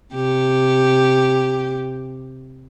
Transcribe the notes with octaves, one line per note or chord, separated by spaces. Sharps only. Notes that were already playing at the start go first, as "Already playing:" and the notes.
C3 G4